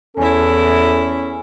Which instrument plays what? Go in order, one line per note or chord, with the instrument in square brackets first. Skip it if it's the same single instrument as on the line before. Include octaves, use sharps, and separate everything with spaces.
[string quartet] E2 E4 [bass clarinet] C#4 [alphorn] A4